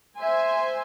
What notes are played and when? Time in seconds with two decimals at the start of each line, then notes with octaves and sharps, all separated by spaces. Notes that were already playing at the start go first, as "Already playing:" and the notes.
0.19 C5 E5 G#5 C6